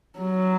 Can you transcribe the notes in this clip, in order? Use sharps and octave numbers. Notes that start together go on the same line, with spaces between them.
F#3